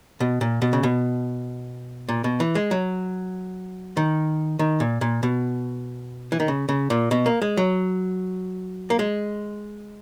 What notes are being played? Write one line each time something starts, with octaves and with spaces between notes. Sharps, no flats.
B2
A#2
B2
C#3
B2
A#2
B2
E3
G#3
F#3
D#3
D#3
A#2
A#2
B2
E3
D#3
C#3
C#3
A#2
B2
A#3
G#3
F#3
A#3
G#3